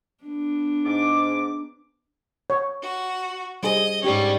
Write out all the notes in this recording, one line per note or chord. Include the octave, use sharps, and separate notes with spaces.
B3 D4
G#2 D6
C#5
F#4
G3 G#4 C5 D#5
G#2 G3 C#4 G4